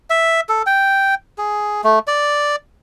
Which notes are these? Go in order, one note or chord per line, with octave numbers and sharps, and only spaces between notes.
E5
A4
G5
G#4
A3
D5